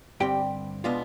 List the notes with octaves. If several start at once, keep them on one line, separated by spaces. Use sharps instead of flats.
G2 D3 G3 C4 G4 G5
B2 G#3 B3 D4 F4 F5